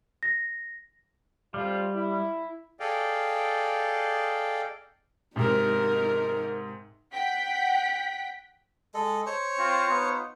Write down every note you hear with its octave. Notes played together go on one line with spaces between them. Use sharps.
A#6
G3 A3 C4 F4
E4
G#4 A4 D5 D#5 F5 G5
G#2 C3 D#4 A#4
F#5 G5 B6
G#3 A4 D#5
C5 C#5 C#6
C4 F4
B3 D#4 F4